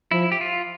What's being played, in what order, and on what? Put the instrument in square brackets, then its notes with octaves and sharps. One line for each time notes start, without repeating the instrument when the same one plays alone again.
[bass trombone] F3 [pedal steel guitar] E4
[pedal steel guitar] G4
F4